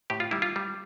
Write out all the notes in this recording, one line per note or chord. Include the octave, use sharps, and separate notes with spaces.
A2 G4
F4
G3 E4
F4
G3